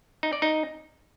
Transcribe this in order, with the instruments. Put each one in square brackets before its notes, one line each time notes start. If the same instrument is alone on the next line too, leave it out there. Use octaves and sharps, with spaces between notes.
[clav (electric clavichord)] D#4
D5
D#4